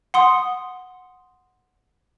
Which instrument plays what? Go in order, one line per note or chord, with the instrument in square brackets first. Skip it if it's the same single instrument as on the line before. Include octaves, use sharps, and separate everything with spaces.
[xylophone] F#5 C6 D#6